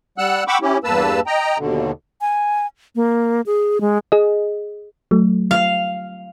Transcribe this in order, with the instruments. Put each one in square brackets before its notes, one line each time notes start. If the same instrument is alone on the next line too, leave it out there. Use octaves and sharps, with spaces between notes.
[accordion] G3 F#5 E6 F#6
F#5 G5 B5 C#6 D6 E6
C#4 E4 G4
E2 G2 A#3 B4 A5 E6
D#5 G5 A#5
D#2 B2 D3
[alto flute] G#5
A#3
G#4
G#3
[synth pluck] G#4 D#5
F#3 A3
[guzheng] F5